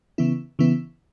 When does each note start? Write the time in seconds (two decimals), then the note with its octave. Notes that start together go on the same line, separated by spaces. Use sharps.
0.18 C#3 E3 B3 E4
0.59 C#3 E3 B3 E4